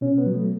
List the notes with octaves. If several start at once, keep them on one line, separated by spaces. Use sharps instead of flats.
B2 C#4
B3
F#3
A3